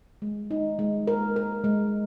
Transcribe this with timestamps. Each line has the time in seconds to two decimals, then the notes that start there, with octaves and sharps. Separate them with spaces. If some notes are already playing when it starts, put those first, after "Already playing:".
0.22 G#3
0.51 D#4
0.79 G#3
1.07 A#4
1.36 A#4
1.64 G#3